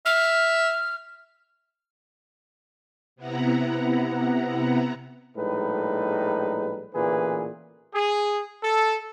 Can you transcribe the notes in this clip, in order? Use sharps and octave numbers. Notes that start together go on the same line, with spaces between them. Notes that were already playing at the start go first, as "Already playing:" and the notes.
E5 F6
C3 B3 E4 F#5 A#5
A#1 A2 G3 G#3 D#4 B4
A1 A#2 D3 E3 G#4 B4
G#4
A4